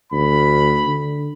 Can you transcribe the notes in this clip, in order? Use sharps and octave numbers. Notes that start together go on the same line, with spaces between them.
D2 B5
D3